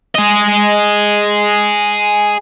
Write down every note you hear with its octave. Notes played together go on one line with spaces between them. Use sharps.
G#4 D#5